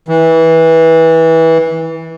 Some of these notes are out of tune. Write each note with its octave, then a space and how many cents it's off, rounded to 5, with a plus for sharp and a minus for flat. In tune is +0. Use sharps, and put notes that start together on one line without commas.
E3 -20